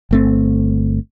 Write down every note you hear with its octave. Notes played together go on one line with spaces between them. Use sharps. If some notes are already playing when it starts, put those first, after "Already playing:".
G1 A3 C4